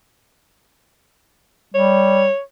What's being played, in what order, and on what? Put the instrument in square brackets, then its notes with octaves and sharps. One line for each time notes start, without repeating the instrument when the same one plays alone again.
[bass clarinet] G3 [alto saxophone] C#5